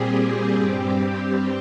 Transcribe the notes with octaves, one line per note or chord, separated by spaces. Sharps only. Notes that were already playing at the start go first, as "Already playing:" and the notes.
Already playing: A#2 G3 C4 G4 G#4
G2 G3 C4 G4